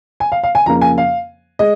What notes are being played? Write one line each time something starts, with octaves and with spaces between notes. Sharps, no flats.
G#5
F5
F5
G#5
F2 C#3 A#3 A#5
G#5
F5
G#3 D#5